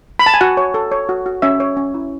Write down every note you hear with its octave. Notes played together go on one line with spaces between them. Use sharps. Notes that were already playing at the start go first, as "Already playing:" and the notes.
B5
A5
G#5
F#4 F#5
C#5
A4
C#5
F#4
F#4
C#4 E5
C#5
C#4
E4